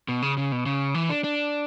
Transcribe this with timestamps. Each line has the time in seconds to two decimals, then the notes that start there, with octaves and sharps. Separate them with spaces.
0.08 B2
0.22 C#3
0.37 C#3
0.52 B2
0.66 C#3
0.95 E3
1.10 D4
1.24 D4